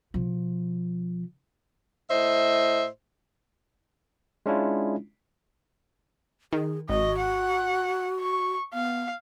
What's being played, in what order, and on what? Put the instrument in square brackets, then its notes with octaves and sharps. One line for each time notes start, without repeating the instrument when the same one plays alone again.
[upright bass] B2 F3
[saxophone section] A2 C5 D#5 E5
[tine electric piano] G#3 C#4 D4 E4 F4
[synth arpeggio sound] D#3 [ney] G#4
[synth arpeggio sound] G#1 [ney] F#4 [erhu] D#5
[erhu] F#5
C#6
[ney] B3 [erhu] F5